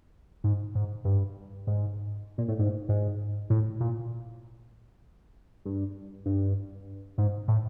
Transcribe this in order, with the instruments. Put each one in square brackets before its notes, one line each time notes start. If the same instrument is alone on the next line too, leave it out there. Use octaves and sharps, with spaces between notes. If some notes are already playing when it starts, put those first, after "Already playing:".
[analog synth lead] G#2
G#2
G2
G#2
A#2
A2
G#2
G#2
A2
A#2
G2
G2
G#2
A2